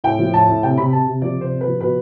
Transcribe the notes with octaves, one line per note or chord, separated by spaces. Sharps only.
A2 G5
F3
A2 A5
A2
C3 G5
C3 B5
C3 A5
C3
F3 D5
C3 C5
C3
B4
F3
B2 B4